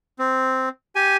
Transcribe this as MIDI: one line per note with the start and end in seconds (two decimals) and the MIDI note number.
0.19 0.69 60
0.95 1.17 67
0.95 1.17 80